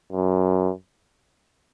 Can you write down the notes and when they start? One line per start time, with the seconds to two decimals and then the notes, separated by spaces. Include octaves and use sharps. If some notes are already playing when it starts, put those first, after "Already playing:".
0.12 F#2